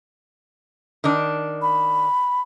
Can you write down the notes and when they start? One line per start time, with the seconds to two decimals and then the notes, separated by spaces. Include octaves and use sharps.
1.04 D#3 D4
1.62 B5